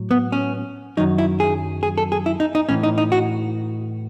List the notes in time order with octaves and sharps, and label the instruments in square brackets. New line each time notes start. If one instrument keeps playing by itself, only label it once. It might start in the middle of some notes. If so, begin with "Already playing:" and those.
Already playing: [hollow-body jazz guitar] A2 F#3
B3
C#4
F#2 D#3 F#3 D#4
E4
G#4
G#4
A4
G#4
E4
D#4
D#4
A2 E3 C#4
D#4
D#4
F#4